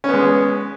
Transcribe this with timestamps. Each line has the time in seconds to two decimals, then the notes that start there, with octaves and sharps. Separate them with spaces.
0.04 C#4
0.09 B3
0.14 G#3